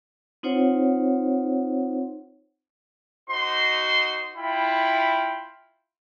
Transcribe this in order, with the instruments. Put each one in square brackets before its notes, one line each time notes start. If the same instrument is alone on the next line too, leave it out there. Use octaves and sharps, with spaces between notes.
[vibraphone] C4 D#4 F4 C5 C#5 F#5
[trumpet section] D#4 F#4 C5 C6
E4 F4 G5 B5